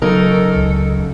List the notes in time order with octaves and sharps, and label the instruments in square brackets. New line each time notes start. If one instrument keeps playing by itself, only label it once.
[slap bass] C#3 F#3 [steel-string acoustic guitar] D#4 A#4 [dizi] A4
[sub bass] C#2